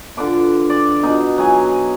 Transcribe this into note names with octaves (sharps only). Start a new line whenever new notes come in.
D3 F4 B4 D6
D5
B2 D#4
F#3 G#4 G#5